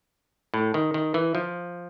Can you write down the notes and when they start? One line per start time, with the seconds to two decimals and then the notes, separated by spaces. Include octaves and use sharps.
0.54 A2
0.74 D#3
0.94 D#3
1.14 E3
1.35 F3